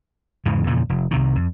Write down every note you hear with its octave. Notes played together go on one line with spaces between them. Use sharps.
E2 G#2 C#3 E3
E2 A#2 C#3 F3
F1
C2 C3 D#3
F2